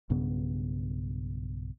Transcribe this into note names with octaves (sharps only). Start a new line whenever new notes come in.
B1 G2 C#3 B3